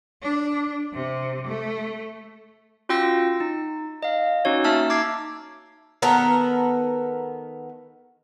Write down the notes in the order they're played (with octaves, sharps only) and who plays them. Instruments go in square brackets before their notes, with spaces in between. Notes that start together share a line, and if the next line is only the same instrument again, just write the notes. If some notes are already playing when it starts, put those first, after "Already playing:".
[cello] D4
C3
A3
[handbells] C#4 F4 F#4 G5 E6 A#6
D#4
D#5 F5
C#4 D#4 F#4 C#5
A#3 D#4 E5 A5 E6 F6
D6 G#6 C7
[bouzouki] D#3 B3 A4 A#4